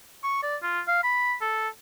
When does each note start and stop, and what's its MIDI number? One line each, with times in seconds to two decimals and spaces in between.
0.24 0.41 85
0.43 0.56 74
0.62 0.80 65
0.88 1.03 77
1.03 1.35 83
1.41 1.68 69